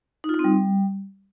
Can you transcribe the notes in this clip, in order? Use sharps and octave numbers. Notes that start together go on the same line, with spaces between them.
D#4
F4
D#4
C4
G3